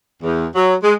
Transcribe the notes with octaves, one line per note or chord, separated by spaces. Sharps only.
E2
F#3
G#3